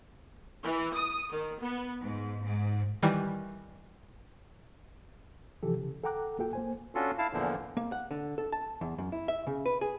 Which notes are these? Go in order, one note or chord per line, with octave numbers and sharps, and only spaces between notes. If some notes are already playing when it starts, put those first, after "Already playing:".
E3
D#6
D#3
B3
G#2
G#2
D#3 E3 G3
C3 E3 F3 G4 A4
C#3
A4 F#5 G5 A#5 D6 F#6
A#3 F4 F#4 A4 G5
A#3 C5 G#5
C#4 D4 F4 F#4 A4
E4 F5 A5
E2 A#2 D3 E3 F3
A#3
F#5
D3
A4
A5
E2
F#2
E4
E5
C#3
B4
G#4